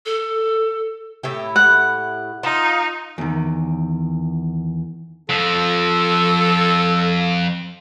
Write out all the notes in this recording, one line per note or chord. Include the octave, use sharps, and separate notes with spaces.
A4
A2 E4 G4
F#5
D#4 F4
E2 D#3
F2 F3 A4